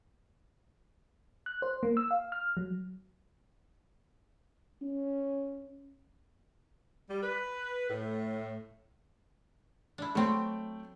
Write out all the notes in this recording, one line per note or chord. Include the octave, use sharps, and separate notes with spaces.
F#6
C5
A#3
E6
F5
F6
F#3
C#4
G3
B4
A2
D4 E4
F#3 A3 C4 G5